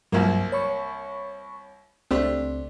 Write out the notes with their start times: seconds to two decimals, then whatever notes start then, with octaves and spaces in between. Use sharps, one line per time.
0.12 C2 G2 F3 F#3 A#3
0.52 C#5 B5 C#6
2.11 C#2 A3 C4 D4 G4